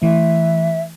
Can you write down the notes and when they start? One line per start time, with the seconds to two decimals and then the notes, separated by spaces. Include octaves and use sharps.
0.02 E3 A3 E5